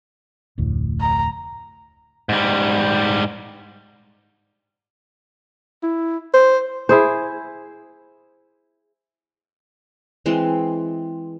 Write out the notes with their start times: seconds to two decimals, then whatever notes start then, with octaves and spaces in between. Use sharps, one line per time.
0.58 F1 D2 A2
1.01 A#5
2.29 G#2 G3
5.83 E4
6.34 C5
6.89 E4 G#4 C5
10.26 E3 G#3 C4 C6